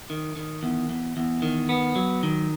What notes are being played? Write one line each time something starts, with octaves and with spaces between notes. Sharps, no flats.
D#3
D#3
E2
E2
E2
D#3
B3
F#3
D#3